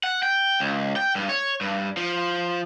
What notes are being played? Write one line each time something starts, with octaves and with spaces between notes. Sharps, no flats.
F#5
G5
C#2
G5
G2
C#5
G2
F3